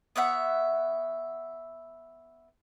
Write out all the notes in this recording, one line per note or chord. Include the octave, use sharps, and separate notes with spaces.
B3 C#5 E5 F#5